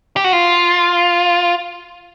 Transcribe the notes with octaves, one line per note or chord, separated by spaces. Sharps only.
G4
F#4
F4